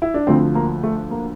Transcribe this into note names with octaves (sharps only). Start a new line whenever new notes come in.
E4
D4
D2 D3 F3 C4
A#3
A3
A#3